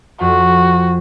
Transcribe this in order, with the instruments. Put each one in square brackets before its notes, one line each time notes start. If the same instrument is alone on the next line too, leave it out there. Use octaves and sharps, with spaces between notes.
[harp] F2 [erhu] F#4